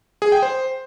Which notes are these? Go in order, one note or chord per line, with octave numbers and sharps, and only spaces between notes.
G#4
G5
C5